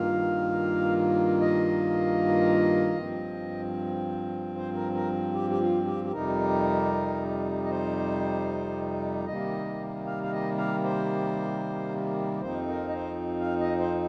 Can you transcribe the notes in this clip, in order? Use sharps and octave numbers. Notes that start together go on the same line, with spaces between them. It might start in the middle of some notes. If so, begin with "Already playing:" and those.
Already playing: G2 D#3 A#3 F4 F5
D#5
G2 F3 C4
C5
A#4
A#4
G4
G4
F4
G4
G4
F2 C3 G3 D#4 A#4
D#5
C5
C3 D#3 G3 A#3 D#5
F5
F5
D#5
F5
C5
F2 F3 C4 D#4 C5
A#4
D#5
C5
F5
D#5
C5